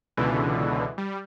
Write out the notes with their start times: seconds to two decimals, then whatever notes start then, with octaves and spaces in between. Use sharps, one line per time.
0.17 C#2 B2 D3 E3
0.98 G3